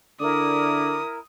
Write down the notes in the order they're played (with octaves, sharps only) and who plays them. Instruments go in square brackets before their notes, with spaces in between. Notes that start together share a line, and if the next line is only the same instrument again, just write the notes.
[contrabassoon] D3 [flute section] E4 A#4 [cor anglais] D5 [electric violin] D#6